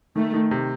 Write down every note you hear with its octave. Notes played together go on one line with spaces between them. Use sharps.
D#3 A3
D#3
C3